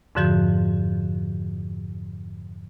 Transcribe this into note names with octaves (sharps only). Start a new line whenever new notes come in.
F2 G#2 D3 F3 F#4 G6